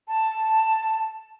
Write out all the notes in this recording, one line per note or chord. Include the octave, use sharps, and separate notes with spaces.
A5